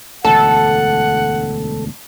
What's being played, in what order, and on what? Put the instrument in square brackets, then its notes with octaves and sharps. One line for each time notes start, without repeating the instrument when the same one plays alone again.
[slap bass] E1 D2 G#2 [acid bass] A4 [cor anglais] F#5 [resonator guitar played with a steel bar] A5